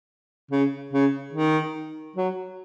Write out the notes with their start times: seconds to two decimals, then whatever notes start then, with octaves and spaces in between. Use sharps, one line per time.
0.51 C#3
0.93 C#3
1.33 D#3
2.16 F#3